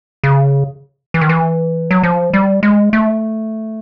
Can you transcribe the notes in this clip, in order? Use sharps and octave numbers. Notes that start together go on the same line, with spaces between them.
C#3
E3
D#3
E3
F#3
F3
G3
G#3
A3